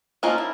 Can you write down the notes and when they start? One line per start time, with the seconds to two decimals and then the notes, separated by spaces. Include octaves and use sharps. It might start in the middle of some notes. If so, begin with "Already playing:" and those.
0.23 F3 A#3 C#4 D#4 F4
0.38 E4